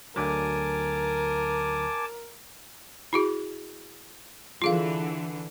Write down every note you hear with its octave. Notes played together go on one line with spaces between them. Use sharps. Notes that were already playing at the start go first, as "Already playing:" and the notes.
D2 D3 F#3 A#4 G#5 A5 D6
E4 F#4 G#4
D3 E3 F4 G#4 F5